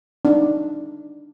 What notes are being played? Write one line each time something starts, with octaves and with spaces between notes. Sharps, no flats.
D4 D#4